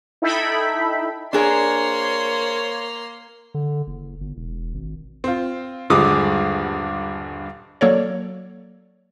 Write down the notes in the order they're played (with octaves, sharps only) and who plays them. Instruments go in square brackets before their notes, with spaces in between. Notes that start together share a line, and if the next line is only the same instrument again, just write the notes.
[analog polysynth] D#4 E4 A4 E5 G5 B5
[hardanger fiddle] A#3 C6 [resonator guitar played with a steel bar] D4 G#4 A#4 [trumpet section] C5 C#5
[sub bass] D3
F#1
G1
E1
G#1
[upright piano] C4 F4
D#1 G2 D3 G#3 D6 D#6
[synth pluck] F#3 A#3 A4 C#5 D5